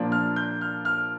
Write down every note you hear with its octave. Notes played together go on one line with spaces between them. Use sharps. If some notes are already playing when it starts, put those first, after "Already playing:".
Already playing: A#2 F3 A#3 D4
F6
G6
F6
F6